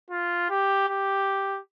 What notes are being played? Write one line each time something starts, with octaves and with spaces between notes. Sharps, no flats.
F4
G4
G4